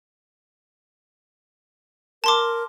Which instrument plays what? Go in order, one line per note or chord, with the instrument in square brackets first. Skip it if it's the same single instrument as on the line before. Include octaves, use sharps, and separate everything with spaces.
[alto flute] A#4 [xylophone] A5 C6 D6